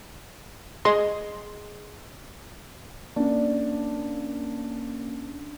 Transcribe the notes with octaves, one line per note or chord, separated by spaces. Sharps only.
G#4 D#5 C6
A#3 C#4 D4